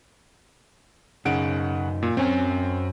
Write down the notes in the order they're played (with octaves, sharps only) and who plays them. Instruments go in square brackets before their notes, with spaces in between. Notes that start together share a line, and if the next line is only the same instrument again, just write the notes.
[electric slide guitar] F#2 D#4 [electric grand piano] C#3 F#5 D7
[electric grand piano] A#2
[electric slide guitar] F#2 C#5 G#5 [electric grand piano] C4 C#4